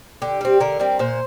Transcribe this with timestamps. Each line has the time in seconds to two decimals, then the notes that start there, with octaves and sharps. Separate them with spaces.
0.22 D3 G4
0.41 G3 C4
0.60 D3 A#4
0.80 G3 C4
0.99 A#2 C5